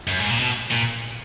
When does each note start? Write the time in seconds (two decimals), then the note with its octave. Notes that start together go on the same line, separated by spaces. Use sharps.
0.07 F#2
0.19 G#2
0.28 A#2
0.39 B2
0.71 A#2